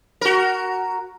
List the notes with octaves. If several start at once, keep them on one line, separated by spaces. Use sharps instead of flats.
F#4 A#4